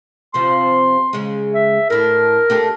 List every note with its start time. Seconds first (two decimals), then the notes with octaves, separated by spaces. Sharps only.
0.34 C3 F3 C6
1.13 C#3 G#3
1.54 E5
1.90 A2 D4 A#4
2.50 A3 D4 G4